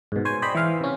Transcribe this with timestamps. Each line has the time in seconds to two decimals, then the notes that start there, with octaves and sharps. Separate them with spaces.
0.12 G#2 B2
0.25 C5 C#5 G#5
0.42 C5 D5 D#5 G5 B5
0.55 E3 C5 E5 F5
0.81 C3 C#4